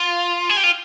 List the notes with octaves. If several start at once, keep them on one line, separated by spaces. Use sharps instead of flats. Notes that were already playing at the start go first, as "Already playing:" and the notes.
Already playing: F4
G#4
G4
F4